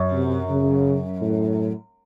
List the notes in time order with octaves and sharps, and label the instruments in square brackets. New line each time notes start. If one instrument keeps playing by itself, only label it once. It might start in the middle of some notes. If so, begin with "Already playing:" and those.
Already playing: [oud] F#2
[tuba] C3
C#3
A2